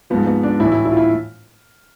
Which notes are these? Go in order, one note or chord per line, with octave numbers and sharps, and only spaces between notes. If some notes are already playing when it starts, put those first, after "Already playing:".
G#2 F3 B3
B3
D4
A2 E3 E4
E4
E4
F4
E4